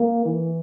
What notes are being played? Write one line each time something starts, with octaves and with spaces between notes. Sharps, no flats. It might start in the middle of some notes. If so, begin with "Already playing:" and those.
Already playing: A#3
E3